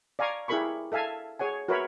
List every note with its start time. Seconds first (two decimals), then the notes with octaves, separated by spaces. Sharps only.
0.19 D5 F5 G#5 A#5 C#6
0.48 E4 G4 G#4 A#4 B5 C#6
0.92 A4 E5 F5 G#5 A5
1.39 G#4 C#5 F#5 G#5
1.68 F#4 A#4 B4 C#5 E5 B5